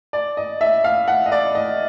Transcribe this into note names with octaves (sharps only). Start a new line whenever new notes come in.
D5
D#5
E5
F5
F#5
D#5
D5
D#5